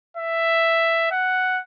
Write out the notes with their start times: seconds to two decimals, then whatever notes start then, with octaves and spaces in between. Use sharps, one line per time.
0.17 E5
1.11 F#5